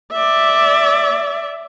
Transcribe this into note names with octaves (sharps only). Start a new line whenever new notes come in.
D5 E5